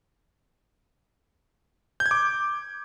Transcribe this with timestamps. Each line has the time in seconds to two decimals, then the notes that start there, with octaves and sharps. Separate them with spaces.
2.00 G6
2.06 G#6
2.11 D6